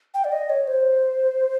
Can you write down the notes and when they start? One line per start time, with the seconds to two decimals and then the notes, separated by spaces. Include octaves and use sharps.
0.14 G5
0.24 D5
0.32 D#5
0.50 C#5
0.67 C5